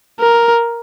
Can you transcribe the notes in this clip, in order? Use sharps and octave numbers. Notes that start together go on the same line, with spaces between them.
A#4